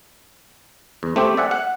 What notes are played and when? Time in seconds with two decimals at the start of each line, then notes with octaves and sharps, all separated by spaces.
1.03 E2
1.16 A3 C4 G4
1.37 D5 E5 F#5 G#5
1.51 F#5